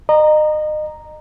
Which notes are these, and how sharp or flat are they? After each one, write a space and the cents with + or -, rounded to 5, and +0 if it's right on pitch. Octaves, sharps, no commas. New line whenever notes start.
D#5 -30 A#5 +0